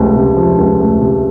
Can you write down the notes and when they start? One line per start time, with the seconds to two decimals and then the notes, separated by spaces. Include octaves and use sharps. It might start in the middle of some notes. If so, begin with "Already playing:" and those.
Already playing: C#2 C3 F3 A3
0.15 C3
0.37 F3
0.58 C#2
0.80 A3
1.02 C3